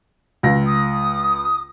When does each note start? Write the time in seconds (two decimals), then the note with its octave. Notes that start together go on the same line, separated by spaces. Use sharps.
0.43 C#2 A#6
0.66 D#6